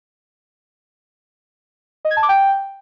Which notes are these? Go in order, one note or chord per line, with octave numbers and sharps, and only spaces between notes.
D#5
G#6
A5
D6
G5